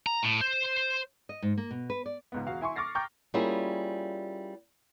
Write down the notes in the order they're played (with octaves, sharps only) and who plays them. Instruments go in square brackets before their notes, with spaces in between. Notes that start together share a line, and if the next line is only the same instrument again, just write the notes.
[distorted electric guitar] A#5
A2
C5
[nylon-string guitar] D#5
G#2
A#3
B2
B4
D5
[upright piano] C#2 G#2 B3
E1 F#4 F5
E4 G#5 C6 C#6
C#6 D6 F6 A6 A#6 C7
G5 A#5 C#6 D6 F6 G6
[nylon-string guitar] G3 A#3 C#4 E4 F4 G#4